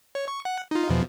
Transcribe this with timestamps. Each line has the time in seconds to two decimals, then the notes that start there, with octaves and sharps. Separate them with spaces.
0.15 C#5
0.28 C#6
0.45 F#5
0.71 D#4 F4
0.89 E2 B2 F3